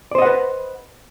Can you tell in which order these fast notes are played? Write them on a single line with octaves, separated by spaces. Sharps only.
D5 C5 D#5 F#5 B4